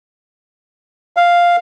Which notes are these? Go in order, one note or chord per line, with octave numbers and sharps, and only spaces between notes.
F5